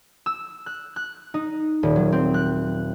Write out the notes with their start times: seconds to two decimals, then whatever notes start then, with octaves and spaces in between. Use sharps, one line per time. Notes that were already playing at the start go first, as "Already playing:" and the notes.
0.26 E6
0.66 F#6
0.96 F#6
1.34 D#4
1.83 D#1
1.96 F#3
2.12 C4
2.34 F#6